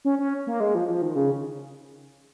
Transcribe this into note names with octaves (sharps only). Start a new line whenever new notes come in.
C#4
C#4
A#3
G#3
F3
F3
D#3
C#3